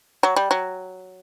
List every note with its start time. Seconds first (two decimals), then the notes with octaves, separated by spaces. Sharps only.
0.23 F#3
0.36 G3
0.51 F#3